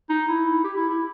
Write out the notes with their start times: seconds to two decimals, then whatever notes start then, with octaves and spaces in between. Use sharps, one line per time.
0.09 D#4
0.28 E4
0.64 G4
0.76 E4
0.89 E4